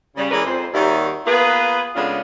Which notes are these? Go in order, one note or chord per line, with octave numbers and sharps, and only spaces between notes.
C#3 G3
E3 G#3 C#4 A#4 B4 D5
F2 C5
D#2 D#3 G3 F#4 D5 E5
A#3 B3 F4 G#4 B4
C#3 G#3 A3 B3 D4 F4